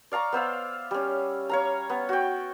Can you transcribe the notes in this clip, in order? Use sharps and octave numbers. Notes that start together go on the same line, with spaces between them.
D5 F5 A#5 C#6
B3 C5 E5 F5
G3 C#4
C#5 F5 A#5
B3
F#4 G5